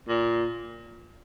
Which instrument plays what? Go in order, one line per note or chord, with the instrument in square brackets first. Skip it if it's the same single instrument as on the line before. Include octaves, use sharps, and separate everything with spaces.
[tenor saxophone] A#2